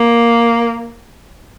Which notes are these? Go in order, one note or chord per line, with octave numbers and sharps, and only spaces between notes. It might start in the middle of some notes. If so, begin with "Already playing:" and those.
Already playing: A#3